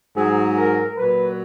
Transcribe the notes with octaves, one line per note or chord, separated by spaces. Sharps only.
G#2 F#3 G#4
A#4
F#3 B4
A#2